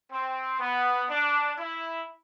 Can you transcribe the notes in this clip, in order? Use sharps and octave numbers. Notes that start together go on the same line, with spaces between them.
C4
B3
D4
E4